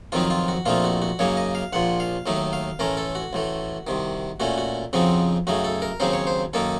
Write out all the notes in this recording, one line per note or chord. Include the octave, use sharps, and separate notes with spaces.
F2 D#3 F#3 C4 D#4 F4
F4
F#4
A#1 A#2 A3 C4 D#4 F4
F#4
F#4
F#2 C#3 F#3 A#3 D#4 C#5
D#5
F5
A#1 A#2 F3 F#5
F5
D#2 D#3 F#3 A3 D#4
F5
A1 A2 A3 C#4 A#4
A4
F#4
A1 A2 A3
C2 C3 D#3
A#2 A3 C#4 F#4
F#4
F2 C#3 F3 C4 D#4 F#4
F#2 C#3 A3 D#4 F#4
A4
A#4
D#2 C#3 F#3 C4 D#4 C5
C#5
C5
F#2 D#3 A#3 D#4 A4